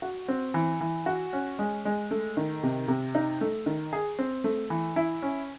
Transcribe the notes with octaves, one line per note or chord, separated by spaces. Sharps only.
F#4
C4
E3
E3
F#4
C#4
G#3
G#3
A3
D#3
C3
C3
D#4
A3
D#3
G#4
C4
A3
E3
E4
C#4